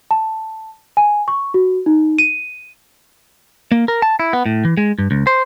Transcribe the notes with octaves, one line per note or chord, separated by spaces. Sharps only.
A5
G#5
C#6
F#4
D#4
D#7
A#3
A#4
A5
E4
B3
A2
E3
G#3
G2
C#2
C5